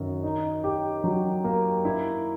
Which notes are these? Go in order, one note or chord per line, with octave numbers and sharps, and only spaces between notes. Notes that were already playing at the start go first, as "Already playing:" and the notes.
Already playing: F#2 D#3
D#4
G4
F#3
A#3
E4